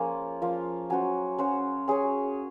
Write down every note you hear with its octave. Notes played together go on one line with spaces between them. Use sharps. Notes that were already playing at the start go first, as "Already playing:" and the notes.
Already playing: F3 A#3 C#4 F4 G#4 C#5 F5
F3 A#3 F4
F#3 C#4 F#4 C5
F#3 C#4 F#4 C5
C#4 G#4 C#5